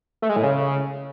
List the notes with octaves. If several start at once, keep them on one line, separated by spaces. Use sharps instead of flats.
A3
G#3
A2
C#3